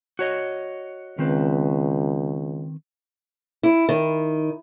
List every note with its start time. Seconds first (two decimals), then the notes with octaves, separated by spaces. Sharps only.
0.19 F#4 C#5 D#5
1.19 C#2 D#3 C4 B4
3.63 E4
3.89 D#3